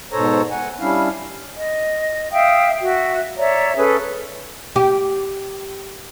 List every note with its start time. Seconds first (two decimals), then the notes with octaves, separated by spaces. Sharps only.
0.12 G#2 B2 A4 C5 C#5 A#5
0.51 F#5 G#5
0.80 G3 C#4 D4 E4 F5
1.55 D#5
2.32 E5 F5 G5 D#6
2.80 F#4 E5
3.37 C#5 D5 E5 A#5
3.77 C#4 G#4 A4 B4
4.76 G4